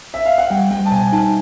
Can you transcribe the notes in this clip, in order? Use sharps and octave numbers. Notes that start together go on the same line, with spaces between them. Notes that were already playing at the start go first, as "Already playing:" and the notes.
E5
F5
F#5
G3 G5
G3 G5
A5
B2 G#5
D#4 A5